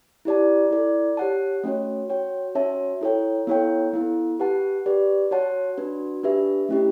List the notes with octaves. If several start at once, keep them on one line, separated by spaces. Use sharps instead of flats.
E4 G4 D5 A5
E4 A4 D5
G4 C#5 F#5 A5
A3 C#4 F#4 C#5
F#4 C#5 G5
C#4 F#4 C#5 E5 A5
E4 A4 C#5 G5
B3 E4 A4 C#5 G5
B3 E4 A4
G4 B4 F#5 A5
G4 B4 D5
F#4 C#5 F#5 A5
D4 F#4 B4
D4 G4 B4 E5
A3 C#4 E4 G4